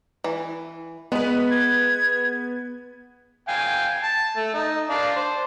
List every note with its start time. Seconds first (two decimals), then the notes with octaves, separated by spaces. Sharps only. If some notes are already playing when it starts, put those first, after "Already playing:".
0.24 E3
1.12 G#3 B3 B4
1.51 G#6
3.48 F5 G5 G#5
4.03 A5
4.36 A3
4.54 D#4
4.90 D4 F5
5.16 C5